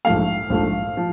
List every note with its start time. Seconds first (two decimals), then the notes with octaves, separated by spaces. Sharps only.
0.05 A#1 G#2 F3 A3 F5
0.50 A#1 G#2 F3 A3
0.97 F3